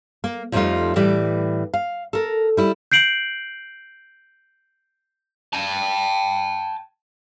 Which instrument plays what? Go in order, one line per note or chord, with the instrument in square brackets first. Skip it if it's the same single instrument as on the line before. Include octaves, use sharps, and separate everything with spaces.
[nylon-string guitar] A#3
F2 F3 G3 A3 D#4 F4
A2 E3 G3 B4 D5
F5
A4 A#4
G3 E4
[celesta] G6 C7 D7 F#7
[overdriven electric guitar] G5 A5